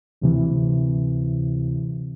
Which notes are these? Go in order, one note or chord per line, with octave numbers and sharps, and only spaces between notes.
D2 C3 E3